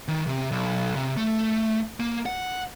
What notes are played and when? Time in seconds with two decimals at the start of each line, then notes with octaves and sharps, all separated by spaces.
0.08 D#3
0.27 C3
0.52 B1
0.96 C3
1.17 A3
2.00 A#3
2.26 F#5